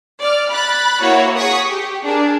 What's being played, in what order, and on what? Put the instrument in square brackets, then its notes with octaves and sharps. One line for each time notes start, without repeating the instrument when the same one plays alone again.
[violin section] D5 F6
B5 F#6 A6
A#3 E4 F#4 C#5 C#6
F#4 G#4 C#6 D#6 B6
G4
D4 G#4 A#4